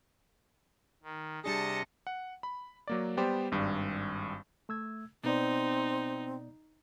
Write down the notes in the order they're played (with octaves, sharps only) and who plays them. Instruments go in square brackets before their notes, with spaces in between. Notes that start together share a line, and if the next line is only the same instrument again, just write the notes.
[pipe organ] D#3
[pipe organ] C3 D#5 A#6 [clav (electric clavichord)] G3 D4 G#4 [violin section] A5 C#7
[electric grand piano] F#5
B5
F#3 A#3 D5
G3 B3 G4 C5 D5
G#1 G2 G3
[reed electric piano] A3 E6 G#6
[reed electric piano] B2 B3 D5 [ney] C4 [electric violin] D#4